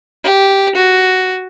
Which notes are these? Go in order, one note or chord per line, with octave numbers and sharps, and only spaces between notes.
G4
F#4